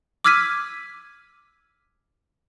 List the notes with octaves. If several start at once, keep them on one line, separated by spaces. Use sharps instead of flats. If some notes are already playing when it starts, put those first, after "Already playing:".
D6 E6 F6 G#6 B6 D#7